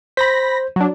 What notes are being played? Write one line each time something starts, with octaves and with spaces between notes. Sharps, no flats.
C5 B5 G6 A#6 B6
F#3 D4